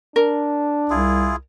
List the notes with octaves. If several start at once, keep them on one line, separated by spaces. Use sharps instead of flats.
D4 A#4
C2 E4 F4 G#4